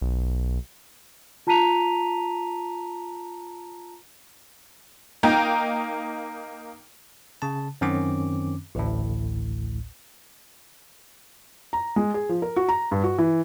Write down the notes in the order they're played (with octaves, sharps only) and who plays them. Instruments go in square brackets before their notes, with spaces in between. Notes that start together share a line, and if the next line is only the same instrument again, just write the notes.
[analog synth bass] B1
[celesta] F4 A5 A#5 B6 D#7 F7
[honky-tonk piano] A#3 D#4 G5 A#5
[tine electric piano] C#3 A5
F#2 D#3 C4 C#4 D6
A1 D2 A2
[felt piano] A#5
G#3
G#4
F3
A#4
F#4
A#5
G2
F#4
E3